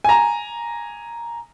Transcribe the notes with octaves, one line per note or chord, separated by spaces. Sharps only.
G#5 A#5